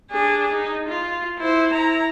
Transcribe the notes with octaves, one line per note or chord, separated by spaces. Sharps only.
D4 G#4
D#4
F4
E4 C5
E4 A#5